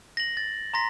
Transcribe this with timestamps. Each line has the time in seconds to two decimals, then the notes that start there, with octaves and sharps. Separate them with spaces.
0.17 A#6 F#7
0.37 A6
0.74 A#5 C6 A#6 B6